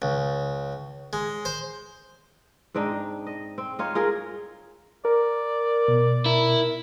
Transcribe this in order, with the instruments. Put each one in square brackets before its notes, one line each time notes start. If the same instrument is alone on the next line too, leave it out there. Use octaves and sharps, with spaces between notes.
[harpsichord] C#2
G#3
C5
[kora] G#2 C4 D4 D#4
D#5
C4
D#4 F4 C#5
F4 G#4 A#4
[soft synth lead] A#4 [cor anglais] D5
[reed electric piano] B2
[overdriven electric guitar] E4 [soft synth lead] A#4